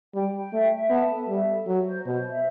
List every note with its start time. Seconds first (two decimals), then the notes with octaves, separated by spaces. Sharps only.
0.14 G3 G5
0.33 G5
0.53 A3 E5
0.72 E5
0.90 B3 A5
1.09 A4
1.28 G3 E5
1.47 A4
1.67 F#3 F#4
1.86 C5
2.05 B2 C5
2.25 E5